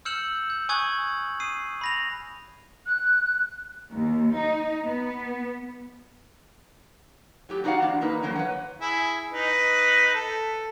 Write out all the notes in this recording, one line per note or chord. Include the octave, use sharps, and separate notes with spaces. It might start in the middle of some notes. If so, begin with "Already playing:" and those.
E6 F6 G6 C#7 E7 F#7
G6
G#5 C#6 D#6 F#6 G#6 F#7
D#6 C7 D#7
B5 A#6 F7
F#6
D#2
D#4
B3
F#3 A3 G4
D4 D#4 F#4 D5 F5 F#5
A2 F3 D4
A#3 D#4 B4
G2 D3 F3 F#3 A#3 C#4
B4 C#5 F#5
E4 G#4
D#4 B4
A4